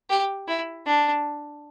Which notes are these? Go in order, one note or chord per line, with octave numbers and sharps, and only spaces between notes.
G4
E4
D4